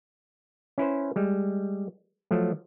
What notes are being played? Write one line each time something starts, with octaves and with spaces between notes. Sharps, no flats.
C#4 E4 B4 C5
G3 G#3
F3 F#3 A3